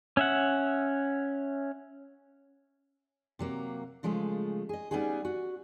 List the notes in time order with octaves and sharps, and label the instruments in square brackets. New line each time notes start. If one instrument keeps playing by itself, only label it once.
[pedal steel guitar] C#4 E5 F#5
[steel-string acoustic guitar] C3 F#3 A#3
C#3 F3 G#3 A3
G#4 D#5
G3 B3 C#4 D#4 F#4 G#4
F#4